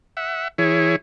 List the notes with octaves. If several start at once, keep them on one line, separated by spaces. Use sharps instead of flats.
E5 F#5
E3 E4 G#4 C#5